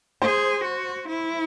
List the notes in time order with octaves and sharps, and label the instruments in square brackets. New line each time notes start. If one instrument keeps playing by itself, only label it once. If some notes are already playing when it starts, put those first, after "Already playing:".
[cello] G#4 [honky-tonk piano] C5
[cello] F#4
E4